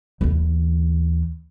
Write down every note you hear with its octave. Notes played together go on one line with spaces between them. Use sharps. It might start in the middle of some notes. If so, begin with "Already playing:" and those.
D#2 E3